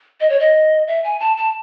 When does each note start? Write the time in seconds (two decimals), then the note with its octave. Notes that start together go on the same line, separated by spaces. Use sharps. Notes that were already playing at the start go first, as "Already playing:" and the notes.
0.20 D#5
0.30 C#5
0.40 D#5
0.87 E5
1.04 G#5
1.20 A5
1.37 A5